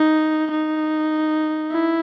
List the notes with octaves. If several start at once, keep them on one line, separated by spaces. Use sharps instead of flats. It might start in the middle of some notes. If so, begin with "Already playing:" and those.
Already playing: D#4
D#4
E4